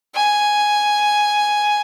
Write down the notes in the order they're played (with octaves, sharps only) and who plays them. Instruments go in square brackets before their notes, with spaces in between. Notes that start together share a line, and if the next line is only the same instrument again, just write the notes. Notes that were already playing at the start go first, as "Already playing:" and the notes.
[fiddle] G#5